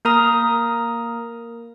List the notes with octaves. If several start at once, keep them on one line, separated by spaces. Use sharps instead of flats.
A#3 A#4 A#5 D#6